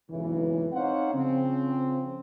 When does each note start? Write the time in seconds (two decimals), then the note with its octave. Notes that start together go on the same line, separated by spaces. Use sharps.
0.11 F#1 B1 F2 G#2 C#3 E3
0.73 C4 D#4 C5 C#5 F5 F#5
1.15 C#3 F3 C4